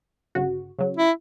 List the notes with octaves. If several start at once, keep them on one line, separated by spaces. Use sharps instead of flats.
G1 C#3 F#4
C#3 F#3
E4